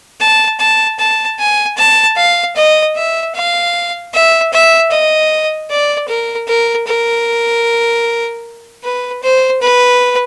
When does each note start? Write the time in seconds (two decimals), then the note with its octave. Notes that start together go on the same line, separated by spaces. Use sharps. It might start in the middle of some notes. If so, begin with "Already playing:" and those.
0.21 A5
0.60 A5
0.99 A5
1.39 G#5
1.77 A5
2.17 F5
2.56 D#5
2.96 E5
3.35 F5
4.14 E5
4.53 E5
4.91 D#5
5.70 D5
6.09 A#4
6.48 A#4
6.87 A#4
8.84 B4
9.23 C5
9.62 B4